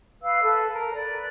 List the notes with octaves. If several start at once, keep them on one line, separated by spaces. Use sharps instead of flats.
B4 F5 E6
A4 B4
A#4
B4 D5